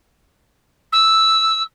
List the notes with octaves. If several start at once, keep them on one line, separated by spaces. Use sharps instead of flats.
E6